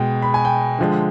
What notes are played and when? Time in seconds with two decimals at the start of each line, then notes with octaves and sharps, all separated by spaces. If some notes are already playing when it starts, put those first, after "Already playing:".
Already playing: B2 G#3 G5
0.22 B5
0.34 G#5
0.45 G5
0.79 D3 F3 G#3